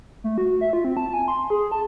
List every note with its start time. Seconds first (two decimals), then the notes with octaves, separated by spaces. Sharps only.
0.24 A3
0.38 F#4
0.61 E5
0.73 F4
0.84 C4
0.97 A5
1.14 G#5
1.28 C6
1.50 G#4
1.72 A5